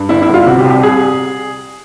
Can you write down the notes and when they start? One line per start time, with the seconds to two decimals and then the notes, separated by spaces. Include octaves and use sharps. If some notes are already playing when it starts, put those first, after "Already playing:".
Already playing: G2
0.09 G1 E4
0.22 E4
0.28 G1
0.34 F4
0.46 C3 F#4
0.59 G4
0.64 C2
0.70 G4
0.83 C2 G#4